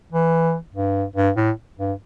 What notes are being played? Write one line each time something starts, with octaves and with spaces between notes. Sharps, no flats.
E3
G2
G2
A2
G2